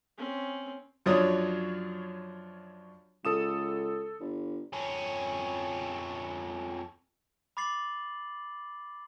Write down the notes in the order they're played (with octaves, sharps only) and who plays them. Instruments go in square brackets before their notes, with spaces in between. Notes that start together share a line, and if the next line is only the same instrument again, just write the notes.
[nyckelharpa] C4 C#4
[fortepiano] F#2 F3 F#3 D4 C#5 D#6
[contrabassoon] C#2 [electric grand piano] A4 D#6 E7
[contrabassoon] G1
[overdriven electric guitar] F2 C#4
[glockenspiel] B5 D6 A6 C7 F#7